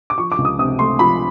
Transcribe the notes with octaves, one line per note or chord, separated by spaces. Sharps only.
D6
F3 C#6
D6
C#2
D#6
C3 D#6
A3 C6
F3 B5